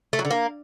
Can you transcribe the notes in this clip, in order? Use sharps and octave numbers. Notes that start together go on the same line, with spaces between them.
A3
F#3
D3
A#3